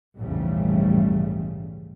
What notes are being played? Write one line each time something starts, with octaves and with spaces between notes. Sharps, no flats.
A#1 E2 G#2 C#3 G3 A3